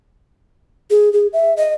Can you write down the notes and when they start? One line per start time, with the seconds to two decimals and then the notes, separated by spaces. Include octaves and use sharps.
0.91 G#4
1.13 G#4
1.33 E5
1.57 D#5